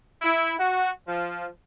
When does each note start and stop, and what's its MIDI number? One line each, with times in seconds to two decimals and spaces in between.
0.22 0.53 64
0.58 0.89 66
1.07 1.46 53